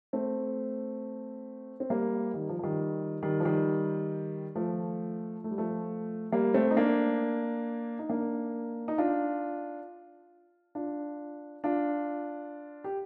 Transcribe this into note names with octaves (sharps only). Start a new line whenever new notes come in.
A3 C4
C4
G3 A#3
D#3 G3
F3
F3
D#3 G3
D#3 G3
F3
D#3 G3
F3 A3
A3
G3
F3 A3
G3 A#3
A3 C4
D#4
A#3 D4
D#4
A#3 D4
D#4
D4 F4
D4 F4
D4 F4
G4